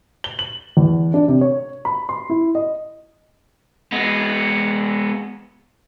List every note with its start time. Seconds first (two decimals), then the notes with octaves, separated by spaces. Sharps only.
0.24 G7
0.39 F#7
0.77 E2
1.14 D4
1.28 C3
1.41 C#5
1.85 B5
2.09 C6
2.30 E4
2.55 D#5
3.92 G#3 B3